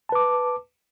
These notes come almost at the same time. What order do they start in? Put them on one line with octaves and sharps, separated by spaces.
A5 B4 D6